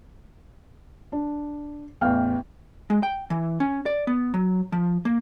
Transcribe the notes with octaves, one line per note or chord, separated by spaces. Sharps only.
D4
A1 E2 F5 G5 F6
G#3
G5
E3
C#4
D5
B3
F#3
F3
A#3